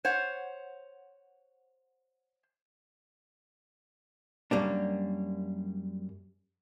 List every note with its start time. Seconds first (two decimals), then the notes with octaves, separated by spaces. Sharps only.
0.05 C5 C#5 F#5
4.51 F#2 G3 A#3 D4